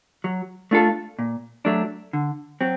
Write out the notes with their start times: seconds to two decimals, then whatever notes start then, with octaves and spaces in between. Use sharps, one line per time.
0.24 F#3
0.71 A3 D4 F4 A4
1.19 A#2
1.65 F#3 A3 D4
2.13 D3
2.61 F#3 C4